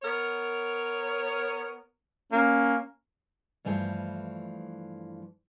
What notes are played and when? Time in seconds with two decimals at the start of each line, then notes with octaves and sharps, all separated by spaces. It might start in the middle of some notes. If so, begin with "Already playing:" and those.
0.02 B3 A#4 C#5
2.32 A#3 C#4
3.65 G2 E3 F3 A3